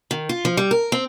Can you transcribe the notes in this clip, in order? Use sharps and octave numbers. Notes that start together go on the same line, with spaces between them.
D#3
F4
F3
G3
A#4
C4